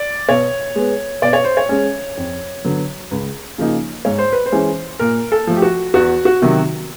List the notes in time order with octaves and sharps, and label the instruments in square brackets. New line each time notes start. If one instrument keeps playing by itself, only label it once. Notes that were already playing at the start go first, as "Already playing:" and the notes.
Already playing: [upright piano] D5
B2 C#5
G#3 B3
B2 D5
C#5
C5
C#5
G#3 C#4
F2
D3 F#3 B3
C#2
C#3 F3 A#3 D#4
G#2 C#5
C5
B4
C5
E3 G#3 C#4
A#2 A#4
A4
F3 A3
G4
F#4
E2 F#4
F#4
C3 D#3 F#3